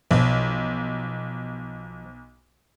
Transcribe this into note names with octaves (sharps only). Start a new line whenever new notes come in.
B1 F3